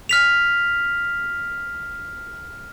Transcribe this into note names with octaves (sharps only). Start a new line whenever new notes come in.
F6 B6 F7